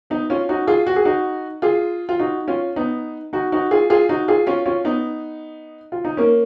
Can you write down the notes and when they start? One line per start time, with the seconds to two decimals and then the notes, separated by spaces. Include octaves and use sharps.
0.10 B3 D#4
0.30 C#4 F4
0.49 D#4 F#4
0.67 F4 G#4
0.87 F#4
0.96 G#4
1.05 D#4 F#4
1.62 F4 G#4
2.09 F4
2.19 D#4 F#4
2.48 C#4 F4
2.76 B3 D#4
3.33 D#4 F#4
3.52 D#4 F#4
3.71 F4 G#4
3.90 F4 G#4
4.09 D#4 F#4
4.28 F4 G#4
4.47 C#4 F4
4.66 C#4 F4
4.85 B3 D#4
5.92 F4
6.05 D#4
6.17 A#3 C#4